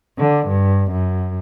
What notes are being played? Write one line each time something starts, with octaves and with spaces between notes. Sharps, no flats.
D3
G2
F#2